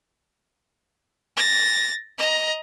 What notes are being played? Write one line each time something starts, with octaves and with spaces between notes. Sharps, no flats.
A6 A#6
D#5 A#5